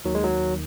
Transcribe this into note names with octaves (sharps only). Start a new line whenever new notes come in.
D#2 D#3 F#3
G#3
F#3